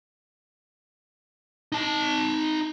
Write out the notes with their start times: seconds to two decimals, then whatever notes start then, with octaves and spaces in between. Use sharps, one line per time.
1.72 D#4 A5